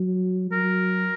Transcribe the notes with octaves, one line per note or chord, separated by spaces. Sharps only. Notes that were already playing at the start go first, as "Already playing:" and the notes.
Already playing: F#3
F#3 A#4